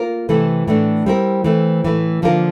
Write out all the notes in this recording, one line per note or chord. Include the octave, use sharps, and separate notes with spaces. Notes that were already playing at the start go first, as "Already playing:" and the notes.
Already playing: A#3 F4 A#4
C3 E3 A3 E4 A4
A2 E3 A3 D4
G3 C4 E4 A#4
E3 A3 C4
A2 E3 A3 E4
D3 F3 A#3 F4 A#4